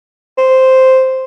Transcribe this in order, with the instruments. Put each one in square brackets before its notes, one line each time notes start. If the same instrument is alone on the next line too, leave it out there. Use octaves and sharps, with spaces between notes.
[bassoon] C5